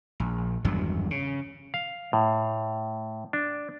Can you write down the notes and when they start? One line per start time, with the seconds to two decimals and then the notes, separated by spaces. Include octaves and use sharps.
0.20 A#1
0.65 G#1 E2 G2 F#3
1.11 C#3
1.74 F5
2.13 A2
3.33 D4